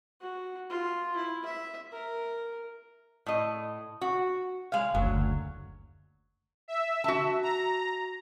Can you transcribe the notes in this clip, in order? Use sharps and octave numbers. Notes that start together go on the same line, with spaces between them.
F#4
F4
E4
E5
A#4
A2 D#5
F#4
G#3 F5
F#1 D2 F#3
E5
F#4 A5
A#5